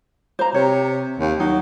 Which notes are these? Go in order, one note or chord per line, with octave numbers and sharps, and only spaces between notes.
C5 A#5
C3 C#5
D#2
F#3 D#4